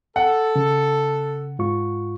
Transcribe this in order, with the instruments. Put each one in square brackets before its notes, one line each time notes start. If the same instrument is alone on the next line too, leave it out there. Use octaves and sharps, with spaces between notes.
[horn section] A4 [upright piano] F#5
[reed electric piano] C#3
G#2 F4 C#6